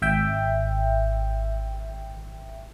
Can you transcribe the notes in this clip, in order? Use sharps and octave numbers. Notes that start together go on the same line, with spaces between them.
G#1 E5 G5